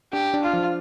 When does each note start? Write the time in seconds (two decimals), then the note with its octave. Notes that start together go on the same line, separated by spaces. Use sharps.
0.13 D4 G4
0.34 D4
0.43 F4
0.53 F3